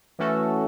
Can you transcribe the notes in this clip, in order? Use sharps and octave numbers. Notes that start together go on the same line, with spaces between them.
E3 A3 C#4 F#4 A4